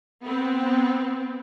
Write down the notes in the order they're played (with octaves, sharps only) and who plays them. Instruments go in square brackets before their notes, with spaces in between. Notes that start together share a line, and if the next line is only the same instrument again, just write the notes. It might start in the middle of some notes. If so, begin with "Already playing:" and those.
[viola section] B3 C4